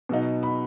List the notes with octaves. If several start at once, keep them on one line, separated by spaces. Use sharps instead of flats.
B2 F#3 B3 D#4
B5